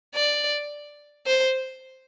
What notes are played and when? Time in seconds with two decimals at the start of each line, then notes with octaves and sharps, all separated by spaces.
0.15 D5
1.26 C5